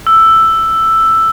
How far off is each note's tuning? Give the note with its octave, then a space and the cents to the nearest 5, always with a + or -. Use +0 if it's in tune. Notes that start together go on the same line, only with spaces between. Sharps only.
E6 +5